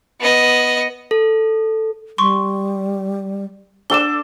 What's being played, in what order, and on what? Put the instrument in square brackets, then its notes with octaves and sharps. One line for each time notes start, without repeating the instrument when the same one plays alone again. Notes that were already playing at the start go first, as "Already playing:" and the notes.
[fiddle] B3 D#5
[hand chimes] A4
[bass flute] G3 [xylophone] C6 C#6
[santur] D4 A4 D6 [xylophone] E7 G7